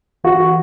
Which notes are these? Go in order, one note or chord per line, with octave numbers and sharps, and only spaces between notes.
E3 F#4